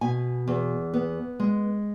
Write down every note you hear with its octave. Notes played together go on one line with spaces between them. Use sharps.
B2 G#5
E2
B3
G#3